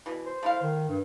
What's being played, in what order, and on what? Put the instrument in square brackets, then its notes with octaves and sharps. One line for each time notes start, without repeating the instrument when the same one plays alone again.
[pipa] B2 E3
[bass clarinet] C5
[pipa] A3 E4 F5
[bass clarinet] D#3
G2